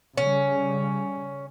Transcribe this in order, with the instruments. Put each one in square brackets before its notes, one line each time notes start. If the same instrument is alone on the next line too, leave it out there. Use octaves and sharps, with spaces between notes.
[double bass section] C#3 G3 [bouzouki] C#4